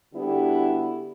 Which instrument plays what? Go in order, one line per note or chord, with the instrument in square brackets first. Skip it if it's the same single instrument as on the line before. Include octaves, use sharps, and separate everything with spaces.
[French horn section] D3 G3 B3 E4 F#4 G4